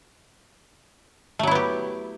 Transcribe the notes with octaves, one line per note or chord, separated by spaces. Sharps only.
F#3 A3 B3 E4 G4